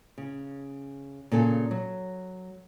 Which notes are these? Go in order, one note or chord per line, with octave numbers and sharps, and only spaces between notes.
C#3
A#2 C#3 A4 G#5
F#3